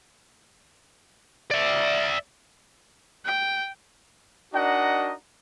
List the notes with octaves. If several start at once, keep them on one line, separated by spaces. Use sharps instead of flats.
D5 E5
G5
D4 D#4 F#4 A#4 D#5 F#5